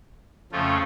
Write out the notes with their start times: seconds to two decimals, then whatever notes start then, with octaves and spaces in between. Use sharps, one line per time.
0.52 F2 C#3 F3 A3 F4